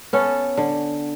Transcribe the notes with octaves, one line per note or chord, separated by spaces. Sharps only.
B3 C#4 A4
D3